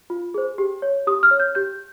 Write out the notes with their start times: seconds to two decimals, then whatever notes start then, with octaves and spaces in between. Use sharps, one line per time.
0.10 F4
0.34 G#4 C5
0.58 G4
0.82 C#5
1.07 G4 D#6
1.23 F6
1.31 C#5
1.40 G6
1.55 G4 G6